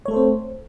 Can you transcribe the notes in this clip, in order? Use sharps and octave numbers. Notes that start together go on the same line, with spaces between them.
A3 C4 A4 C5 C#5